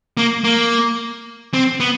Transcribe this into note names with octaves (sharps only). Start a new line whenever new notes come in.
A#3
A#3
C4
B3